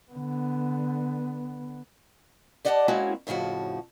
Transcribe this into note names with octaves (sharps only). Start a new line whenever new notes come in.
D3 B3
G4 D5 D#5 F#5 G#5 A5
G#3 A#3 C4 C#4 E4 F#4
F2 A2 C#3 F3 F#4